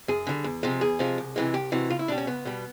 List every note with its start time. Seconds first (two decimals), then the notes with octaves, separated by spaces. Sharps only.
0.08 F#2 G#4
0.27 D3 G3
0.44 E2
0.63 C3 F3 G#3
0.81 E2 G#4
0.99 C3 F3 G#3
1.18 C2
1.36 C3 E3 G#3
1.54 C2 G4
1.72 C3 E3 G#3 F#4
1.90 C#2 F4
1.99 E4
2.08 B2 G3 D4
2.18 C#4
2.27 C#2 B3
2.45 B2 G3